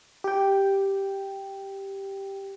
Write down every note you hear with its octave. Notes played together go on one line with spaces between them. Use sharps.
G4 G5